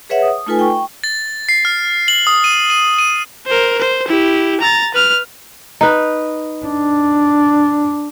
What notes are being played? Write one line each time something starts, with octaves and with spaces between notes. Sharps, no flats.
G#4 B4 C#5 E5 F#5
D#6
A3 D#4 F4 A4 B4 G#5
G5 C#6
A6
C7
F6
F#7
D#6
D#7
D#7
D#7
A#4 C5
C5
E4 G4
A#5 A6
B4 F6
D#4 B4
D4